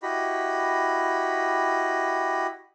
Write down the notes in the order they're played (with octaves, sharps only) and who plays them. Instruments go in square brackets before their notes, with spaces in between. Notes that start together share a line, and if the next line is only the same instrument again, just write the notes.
[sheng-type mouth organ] E4 F#4 G4 D#5 B5